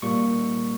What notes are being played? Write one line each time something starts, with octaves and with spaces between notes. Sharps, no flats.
A#2 G3 A#3 C#6